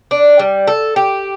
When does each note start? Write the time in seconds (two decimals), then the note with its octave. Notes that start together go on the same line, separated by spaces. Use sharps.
0.11 D4
0.39 G3
0.67 A4
0.96 G4